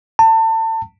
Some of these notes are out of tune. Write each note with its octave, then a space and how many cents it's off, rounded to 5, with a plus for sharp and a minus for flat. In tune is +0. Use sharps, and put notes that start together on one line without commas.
A5 +30